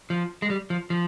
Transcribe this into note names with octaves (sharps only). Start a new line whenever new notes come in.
F3
G#3
G3
F3
F3